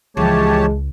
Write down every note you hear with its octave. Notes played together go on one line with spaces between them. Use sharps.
C#2 E3 F3 G#3 G4 C#5 A5